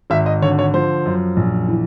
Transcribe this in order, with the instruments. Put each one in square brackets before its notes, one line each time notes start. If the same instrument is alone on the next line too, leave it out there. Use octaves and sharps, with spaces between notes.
[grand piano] G#1 E5
D#5
D3 C#5
C#5
F3 C5
F#2
A#1
E3